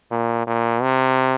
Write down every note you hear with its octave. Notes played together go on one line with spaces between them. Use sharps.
A#2
A#2
C3